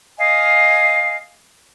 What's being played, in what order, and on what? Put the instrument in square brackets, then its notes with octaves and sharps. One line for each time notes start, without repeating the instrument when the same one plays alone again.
[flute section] D#5 F5 G#5